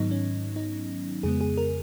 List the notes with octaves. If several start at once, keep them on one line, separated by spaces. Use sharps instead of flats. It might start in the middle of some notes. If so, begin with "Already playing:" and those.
Already playing: G#2 D#3 F#3 B3 D#4
C#4
D#4
F2 C#3 G#3 B3 G#4
G#4
A#4